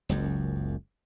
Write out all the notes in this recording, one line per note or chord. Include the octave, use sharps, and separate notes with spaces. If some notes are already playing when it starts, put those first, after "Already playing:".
F#1 C#2 F#2